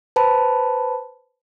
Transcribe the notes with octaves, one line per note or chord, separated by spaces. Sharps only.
B4 C5 A5 B5